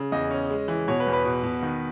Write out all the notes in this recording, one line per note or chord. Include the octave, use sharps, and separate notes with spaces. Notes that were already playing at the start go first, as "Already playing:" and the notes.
Already playing: C#3
E2 D#5
C#4
G#3
E3
B2 C#5
B4
E2
B4
B2
B2
D#3